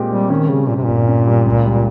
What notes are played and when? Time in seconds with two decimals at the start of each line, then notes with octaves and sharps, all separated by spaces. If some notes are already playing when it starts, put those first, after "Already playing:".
Already playing: A#2 G#3 C4 G4
0.11 G3 C4
0.30 D#3 C#4
0.49 C#3 G3
0.68 G2 A#2
0.77 C3
0.85 G1 A#2
1.07 C#4
1.26 G3
1.46 C#2
1.65 G3